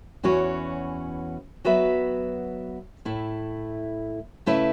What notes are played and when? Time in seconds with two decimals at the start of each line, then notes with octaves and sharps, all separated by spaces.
0.23 E2 E3 C#4 F#4 C#5
1.65 F#3 B3 F#4 B4 E5
3.05 A2 A3 E4
4.46 C#3 A3 E4 B4 E5